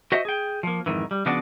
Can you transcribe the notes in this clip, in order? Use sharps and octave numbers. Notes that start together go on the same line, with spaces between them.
F#4 C5 D#5 E5
G#4 G5
F3 A#3
F2 G#2 D#3 E3
G3
C#3 F3 B3 D4 F#4 D5